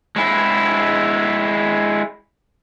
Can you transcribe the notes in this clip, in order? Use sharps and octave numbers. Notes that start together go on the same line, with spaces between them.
G#3 E4